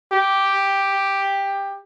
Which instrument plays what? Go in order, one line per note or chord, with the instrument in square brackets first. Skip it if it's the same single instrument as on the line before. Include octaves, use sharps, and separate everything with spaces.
[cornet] G4